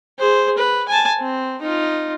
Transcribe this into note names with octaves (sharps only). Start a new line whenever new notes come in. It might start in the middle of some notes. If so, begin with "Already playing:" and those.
G#4 C5
B4
G#5 A5
C4
D#4 F4